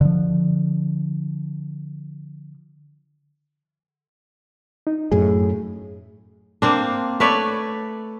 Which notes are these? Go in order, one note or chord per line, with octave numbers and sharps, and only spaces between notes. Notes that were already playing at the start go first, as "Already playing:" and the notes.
D3 F3
D#4
F#2 A2 G#4
A#3 C4 D4
A3 B4 C#5 D5